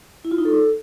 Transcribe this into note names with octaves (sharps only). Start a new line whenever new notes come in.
E4
F4
D#4
A4